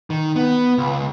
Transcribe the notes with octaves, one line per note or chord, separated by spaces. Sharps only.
D#3
B3
C#2